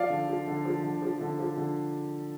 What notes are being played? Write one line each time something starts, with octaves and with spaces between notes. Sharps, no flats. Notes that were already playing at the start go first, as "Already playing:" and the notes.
Already playing: F3 D5 F5
D3
F3
D3
F3
D3
F3
D3
F3
D3